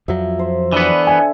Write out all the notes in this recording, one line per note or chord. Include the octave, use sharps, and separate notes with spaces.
F2 F3 F#3 E5
C5
D3 E3 B3
E5 G#5